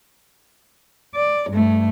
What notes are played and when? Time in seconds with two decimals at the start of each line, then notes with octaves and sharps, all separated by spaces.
1.15 D5
1.50 G2 A3